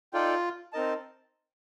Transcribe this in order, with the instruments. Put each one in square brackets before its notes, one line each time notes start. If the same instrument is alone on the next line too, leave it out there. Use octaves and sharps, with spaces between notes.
[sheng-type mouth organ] D#4 A4 D5 G5 [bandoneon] F4
[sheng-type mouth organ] C4 D#4 A#4 D#5 A5